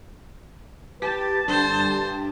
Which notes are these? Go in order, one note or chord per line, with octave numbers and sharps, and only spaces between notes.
G4 B4 A5
G2 D3 C5